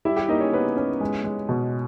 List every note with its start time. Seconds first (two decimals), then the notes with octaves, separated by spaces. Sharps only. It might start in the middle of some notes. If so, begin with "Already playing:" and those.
0.05 G3 E4 E5
0.16 G4 G5
0.28 A#3 D#4 D#5
0.40 C#4 C#5
0.53 B3 C#4 B4
0.76 C#4
1.00 G#3
1.24 G#3
1.49 B2